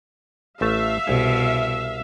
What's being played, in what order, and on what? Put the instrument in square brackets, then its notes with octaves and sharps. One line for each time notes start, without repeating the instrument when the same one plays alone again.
[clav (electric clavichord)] A1 A3 A5 [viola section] E5 F5
[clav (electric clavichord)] C2 G#4 [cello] B2